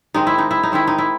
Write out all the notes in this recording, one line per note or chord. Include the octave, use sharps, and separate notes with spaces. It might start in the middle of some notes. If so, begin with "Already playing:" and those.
D#3 G#3 C4 D#4
E4
D#4
E4
D#4
D#3 G#3 C4 E4
D#4
E4